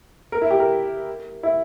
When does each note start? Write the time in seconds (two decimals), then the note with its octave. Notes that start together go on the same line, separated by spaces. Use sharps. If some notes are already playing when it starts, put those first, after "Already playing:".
0.32 A#4
0.42 E4
0.51 G4
0.60 A#4
1.43 E4